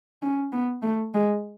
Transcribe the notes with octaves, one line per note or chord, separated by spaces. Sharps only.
C#4
B3
A3
G#3